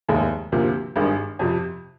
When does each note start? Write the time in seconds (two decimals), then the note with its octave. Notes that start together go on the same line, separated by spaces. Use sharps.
0.08 F1 D#2 D#3 G#3
0.52 D2 C3 F3 A#3
0.96 G#1 G2 D#3 G#3
1.39 F2 C3 F3